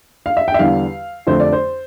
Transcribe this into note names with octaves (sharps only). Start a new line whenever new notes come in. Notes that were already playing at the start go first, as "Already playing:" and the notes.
F5
E5
G5
E5
E2 D3 G3 F5
F2 D3 A3 C5
D5
C5